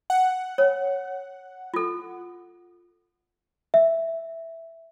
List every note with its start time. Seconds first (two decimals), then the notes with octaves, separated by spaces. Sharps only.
0.10 F#5
0.58 C#5
1.74 F4 A4
3.74 E5